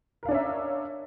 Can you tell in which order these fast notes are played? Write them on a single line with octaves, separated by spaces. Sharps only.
A#4 F5 D4 C#4 E5